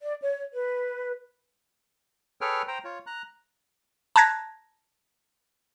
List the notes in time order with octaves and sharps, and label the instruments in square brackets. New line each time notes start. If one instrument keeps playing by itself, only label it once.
[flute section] D5
C#5
B4
[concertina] G#4 A4 B4 C#5 G5 F6
C5 G5 A#5
F4 C#5
A#5 F#6
[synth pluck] A5 A#5 F#6 G#6 A#6